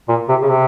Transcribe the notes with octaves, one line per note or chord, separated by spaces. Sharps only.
A#2
C3
C#3
C3